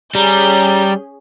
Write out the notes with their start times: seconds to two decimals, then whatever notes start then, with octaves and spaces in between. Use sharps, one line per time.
0.15 G3 C#4 G#4 A#5 G6